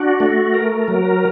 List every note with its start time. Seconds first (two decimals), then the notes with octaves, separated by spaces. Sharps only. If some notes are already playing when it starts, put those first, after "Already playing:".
Already playing: D4 F#4
0.20 A3
0.54 A#4
0.88 F#3